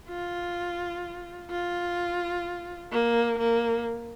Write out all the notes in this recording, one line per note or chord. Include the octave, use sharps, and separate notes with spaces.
F4
F4
A#3
A#3